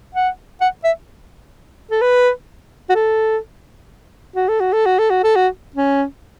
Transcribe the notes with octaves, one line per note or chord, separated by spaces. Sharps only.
F#5
F#5
E5
A4
B4
F#4
A4
F#4
A4
F#4
A4
F#4
A4
F#4
A4
F#4
C#4